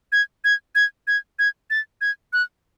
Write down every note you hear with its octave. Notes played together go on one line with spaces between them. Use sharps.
G#6
G#6
G#6
G#6
G#6
A6
G#6
F#6